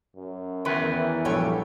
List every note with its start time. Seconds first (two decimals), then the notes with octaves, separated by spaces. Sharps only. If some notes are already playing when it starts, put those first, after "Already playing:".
0.16 F#2
0.65 E2 D#3 E4 B4
0.96 E3
1.25 A#1 G2 F#3 A3 G4 C#5